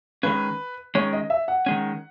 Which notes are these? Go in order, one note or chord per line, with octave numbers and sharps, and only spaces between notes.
D#3 G#3 C#4 B4
D#3 G#3 C#4 C#5
D#5
E5
F#5
D#3 G#3 C#4